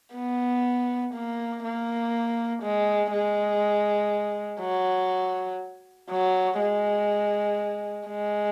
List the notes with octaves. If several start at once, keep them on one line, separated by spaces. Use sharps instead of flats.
B3
A#3
A#3
G#3
G#3
F#3
F#3
G#3
G#3